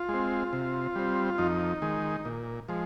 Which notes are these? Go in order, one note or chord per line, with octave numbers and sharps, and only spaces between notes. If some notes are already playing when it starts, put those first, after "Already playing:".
Already playing: F4
G#3 C4
C3
G3 C4
F2 D#4
D#3 G#3
A#2
F3 G#3